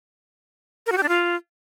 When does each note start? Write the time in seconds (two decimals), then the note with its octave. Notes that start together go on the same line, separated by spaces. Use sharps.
0.86 A#4
0.92 F#4
0.97 G4
1.03 D4
1.09 F4